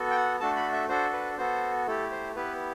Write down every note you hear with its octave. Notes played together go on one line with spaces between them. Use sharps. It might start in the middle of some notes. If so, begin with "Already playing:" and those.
Already playing: B3 F#4 A4
G5
F#5
A3 D4 F#4 A4 A5
B5
E5
D4 F#4 A4 C5
B4
B3 F#4 A4 C5
A3 E4 G4 A4
C5
B3 E4 G4 B4